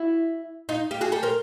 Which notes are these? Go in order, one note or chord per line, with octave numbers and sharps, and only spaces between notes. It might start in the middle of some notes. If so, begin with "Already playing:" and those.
Already playing: E4 F#4
D#4 F4
F4 G4
F#4 G#4
G4 A4
A#4 C5